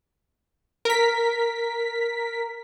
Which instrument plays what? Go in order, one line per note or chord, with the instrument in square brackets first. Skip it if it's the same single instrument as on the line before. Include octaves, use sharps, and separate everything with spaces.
[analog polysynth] A#4 B6